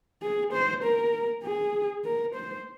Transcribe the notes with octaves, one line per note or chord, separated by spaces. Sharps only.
G#4
C5
A#4
G#4
A#4
C5